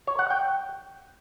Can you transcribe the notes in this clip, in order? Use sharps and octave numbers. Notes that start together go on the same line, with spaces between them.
C#5
F#5
G5